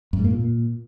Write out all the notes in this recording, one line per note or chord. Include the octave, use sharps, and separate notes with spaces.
F#2
G#2
A#3
A#2